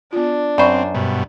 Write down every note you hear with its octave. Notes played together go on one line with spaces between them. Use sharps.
B3 D4 F4
F#2 C4 C5 D5 B5 C#6
G2 B2